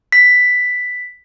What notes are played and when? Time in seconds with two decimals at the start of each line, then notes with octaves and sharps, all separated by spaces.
0.12 B6